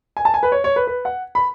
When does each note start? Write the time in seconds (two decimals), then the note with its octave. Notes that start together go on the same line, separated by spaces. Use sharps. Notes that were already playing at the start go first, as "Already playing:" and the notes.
0.17 G#5
0.25 A5
0.34 G#5
0.43 B4
0.52 C#5
0.64 C#5
0.76 B4
0.87 B4
1.05 F#5
1.35 B5